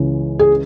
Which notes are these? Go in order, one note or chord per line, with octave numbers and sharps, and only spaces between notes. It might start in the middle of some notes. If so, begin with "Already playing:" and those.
Already playing: C#2 C#3 E3
G#4